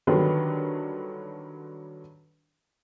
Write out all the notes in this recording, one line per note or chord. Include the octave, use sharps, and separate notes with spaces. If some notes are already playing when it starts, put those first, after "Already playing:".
D3 D#3 F#3 G3 D4 B4